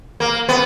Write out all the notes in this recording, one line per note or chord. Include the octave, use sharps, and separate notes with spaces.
A#3
B3